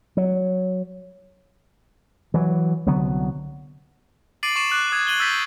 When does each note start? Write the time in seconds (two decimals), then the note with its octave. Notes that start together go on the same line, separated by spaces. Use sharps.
0.17 F#3
2.34 E3 F#3
2.86 C2 D3 F#3 B3
4.43 D6 A6 C7 D7 D#7 F#7
4.56 C#6 C7 E7
4.70 D6 F#6 F#7
4.92 D#6 F#6 G#6
5.07 F#6 D#7 F#7 G7
5.20 E6 G6 A6 B6 D#7